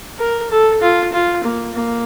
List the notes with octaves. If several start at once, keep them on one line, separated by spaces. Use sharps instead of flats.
A#4
A4
F4
F4
A#3
A#3